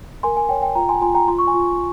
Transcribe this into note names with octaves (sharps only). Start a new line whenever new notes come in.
A#4 G#5 C6
G#5
C#5 G5
G5
F4 G5 A#5
G#5 C6
F4 G#5 C6
G5 A#5
F4 C6
C#6
G#5 C6
F4